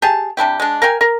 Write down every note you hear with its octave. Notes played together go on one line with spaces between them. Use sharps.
G4 G#4 A5
C3 D4 E4 G4
G#3 D4
A#4 F5 G5 G#5
A#4